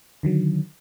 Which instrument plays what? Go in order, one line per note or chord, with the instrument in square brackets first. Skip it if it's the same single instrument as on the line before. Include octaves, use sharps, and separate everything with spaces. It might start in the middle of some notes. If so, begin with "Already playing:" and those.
[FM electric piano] D3 D#3 F#3